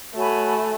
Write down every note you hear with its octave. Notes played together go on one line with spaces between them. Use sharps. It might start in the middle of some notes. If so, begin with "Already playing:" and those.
A3 F#4 C#5 G#5 B5